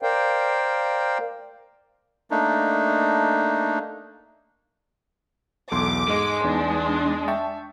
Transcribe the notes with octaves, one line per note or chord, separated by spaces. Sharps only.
A#4 C5 D5 F5 G5
A3 A#3 D4 D#4
B1 E2 A4 C6 D6
G#2 G#3 D#5
E2 B3 D4 D#4
E5 G5 A5 C#6